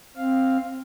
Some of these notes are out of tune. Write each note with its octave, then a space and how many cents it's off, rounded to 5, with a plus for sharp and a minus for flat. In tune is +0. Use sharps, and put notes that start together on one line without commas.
C4 +10 F5 +0